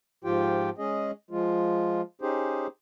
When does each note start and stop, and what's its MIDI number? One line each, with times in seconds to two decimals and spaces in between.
0.24 0.70 44
0.24 0.70 53
0.24 0.70 65
0.24 0.70 67
0.24 0.70 79
0.78 1.11 56
0.78 1.11 61
0.78 1.11 68
0.78 1.11 75
1.31 2.01 53
1.31 2.01 56
1.31 2.01 65
2.22 2.67 61
2.22 2.67 63
2.22 2.67 67
2.22 2.67 68
2.22 2.67 72